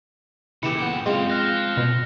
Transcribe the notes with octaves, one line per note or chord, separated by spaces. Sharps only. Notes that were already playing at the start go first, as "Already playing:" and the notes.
A#2 C#3 E3 G4 A4 B4 C#7 E7
B3 G5
F#2 G#3 C4 F4 F5
C5 F5 F6 F#6 A#6
B2